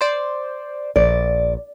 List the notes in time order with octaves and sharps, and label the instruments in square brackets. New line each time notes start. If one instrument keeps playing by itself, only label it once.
[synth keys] C5 D5
[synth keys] A#1 [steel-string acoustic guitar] D5